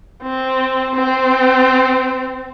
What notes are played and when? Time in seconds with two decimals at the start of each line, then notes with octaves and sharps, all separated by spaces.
0.23 C4
0.95 C4